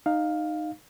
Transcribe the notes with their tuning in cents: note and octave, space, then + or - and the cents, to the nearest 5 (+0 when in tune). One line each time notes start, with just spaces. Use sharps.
D#4 -15 F5 +10